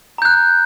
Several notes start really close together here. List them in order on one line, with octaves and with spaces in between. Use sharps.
A#5 G6 F#6